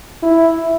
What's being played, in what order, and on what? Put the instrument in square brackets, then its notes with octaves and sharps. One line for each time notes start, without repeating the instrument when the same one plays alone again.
[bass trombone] E4